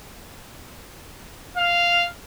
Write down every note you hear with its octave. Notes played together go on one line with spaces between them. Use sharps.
F5